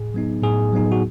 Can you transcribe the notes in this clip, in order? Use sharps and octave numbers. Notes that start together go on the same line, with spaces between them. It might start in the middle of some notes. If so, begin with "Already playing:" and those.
Already playing: A2 G#4
F#3 B3 D#4
A2 G#4
F#3 B3 D#4
F#4